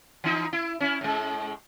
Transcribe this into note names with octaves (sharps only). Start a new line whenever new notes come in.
E3 D#4
E4
C#4 E4
A2 G#3